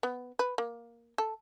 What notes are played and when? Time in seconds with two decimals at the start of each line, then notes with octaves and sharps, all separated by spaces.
0.03 B3
0.39 B4
0.58 A#3
1.18 A4